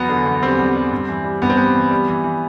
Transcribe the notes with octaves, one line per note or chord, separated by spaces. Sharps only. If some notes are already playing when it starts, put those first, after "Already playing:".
Already playing: E2 F#3 B3
D3
E2
G3 C4
G3
G3
G2
E3
G3
G2 B3
C4
G3 B3
E3
G3
E3
E3